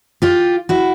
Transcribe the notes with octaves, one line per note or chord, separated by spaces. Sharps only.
F4 G4
E4 F#4